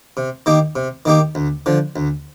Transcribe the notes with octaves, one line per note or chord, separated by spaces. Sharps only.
C3
D#3 A#3 D#4 G4
C3
D#3 A#3 D#4 G4
D2
D3 F3
D2